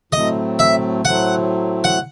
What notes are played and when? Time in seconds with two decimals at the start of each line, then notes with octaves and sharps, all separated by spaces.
0.12 A2 F#3 A3 C4 D#5
0.59 E5
1.05 A2 F#3 A3 C4 F#5
1.84 F#5